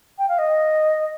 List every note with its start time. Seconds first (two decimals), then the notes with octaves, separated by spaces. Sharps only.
0.18 G5
0.29 F5
0.38 D#5